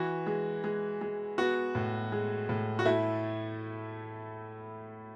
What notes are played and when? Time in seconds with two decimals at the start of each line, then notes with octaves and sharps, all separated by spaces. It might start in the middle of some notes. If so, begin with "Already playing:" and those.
Already playing: E3 F#4
0.27 G#3
0.64 G#3
1.01 G#3
1.38 B3 F#4
1.75 A2
2.12 G#3
2.49 A2
2.79 F#4
2.85 A3 E4